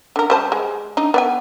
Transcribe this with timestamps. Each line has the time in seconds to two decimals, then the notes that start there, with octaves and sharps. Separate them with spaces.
0.16 D3 A#4
0.30 G3 C5 A5
0.52 G#3
0.97 D4 D#4
1.14 B3 D5 G#5